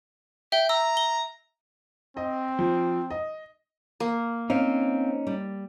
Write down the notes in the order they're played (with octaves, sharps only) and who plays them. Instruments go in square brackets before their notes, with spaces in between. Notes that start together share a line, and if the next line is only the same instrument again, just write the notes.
[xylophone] E5 [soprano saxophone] G5
[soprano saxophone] A#5 [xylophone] E6
[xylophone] G7
[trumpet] C4 [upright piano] D#5
[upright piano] F3
D#5
[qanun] A#3
[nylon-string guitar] C4 F5 [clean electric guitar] C#4 D#4
[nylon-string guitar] G3